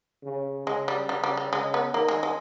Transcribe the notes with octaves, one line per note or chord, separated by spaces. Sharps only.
C#3
C#3 G#3
G3
C#3 G3
G3
G3
C#3 G#3
B3
D#3 A#3
G#3
G#3